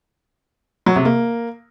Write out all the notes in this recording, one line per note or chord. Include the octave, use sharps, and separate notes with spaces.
F#3
C3
A#3